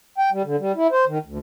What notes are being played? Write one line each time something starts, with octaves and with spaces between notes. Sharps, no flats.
G5
G3
D3
G3
E4
C5
D#3
D2